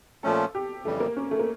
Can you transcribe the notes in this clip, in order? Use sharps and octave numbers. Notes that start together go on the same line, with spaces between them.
A#2 F3 A3 C#4 A4
G4
F2 C#3 E3 G3 A3
A#3
C#4
A3
A#3